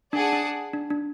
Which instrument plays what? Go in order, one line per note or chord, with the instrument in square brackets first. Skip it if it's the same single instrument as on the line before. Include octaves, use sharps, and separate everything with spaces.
[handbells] D4 [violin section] G#4 D5 F#5 A5
[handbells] D4
D4
D4